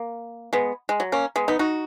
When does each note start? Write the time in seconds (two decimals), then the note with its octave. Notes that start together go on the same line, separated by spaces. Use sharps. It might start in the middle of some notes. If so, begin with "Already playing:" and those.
Already playing: A#3
0.53 G#3 B3
0.89 G#3
1.00 F#3
1.12 A#3 C#4
1.36 G#3 B3
1.48 B3 D#4
1.59 D#4 F#4